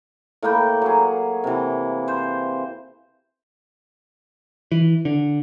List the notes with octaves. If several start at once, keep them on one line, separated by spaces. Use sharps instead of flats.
A2 A#3 G5 B5
F#3 G#4
C3 E3
C5
E3
D3